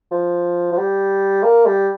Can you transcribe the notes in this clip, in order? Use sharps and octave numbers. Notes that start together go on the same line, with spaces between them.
F3
F3
G3
A#3
G3